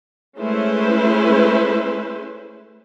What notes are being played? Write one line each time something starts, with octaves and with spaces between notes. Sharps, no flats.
G#3 A3 C#4 E4 B4 C5